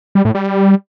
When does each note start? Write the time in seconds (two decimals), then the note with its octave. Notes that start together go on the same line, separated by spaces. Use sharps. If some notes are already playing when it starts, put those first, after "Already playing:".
0.15 G3
0.25 A2
0.35 G3